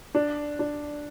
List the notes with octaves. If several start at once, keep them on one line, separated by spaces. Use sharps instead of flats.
D4
D4